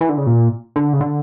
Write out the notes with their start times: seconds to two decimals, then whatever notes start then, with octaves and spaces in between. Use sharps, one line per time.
0.01 E3
0.09 D3
0.18 C#3
0.26 A#2
0.76 D3
0.93 C#3
1.01 D3